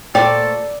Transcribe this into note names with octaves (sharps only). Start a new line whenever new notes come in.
A#2 A3 A4 C5 D5 G5